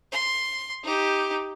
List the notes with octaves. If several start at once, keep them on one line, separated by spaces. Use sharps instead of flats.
C6
D#4 G4